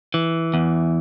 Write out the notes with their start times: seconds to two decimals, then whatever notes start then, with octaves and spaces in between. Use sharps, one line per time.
0.14 E3
0.54 E2